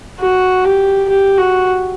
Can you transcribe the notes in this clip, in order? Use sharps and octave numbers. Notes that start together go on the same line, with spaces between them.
F#4
G4
G4
F#4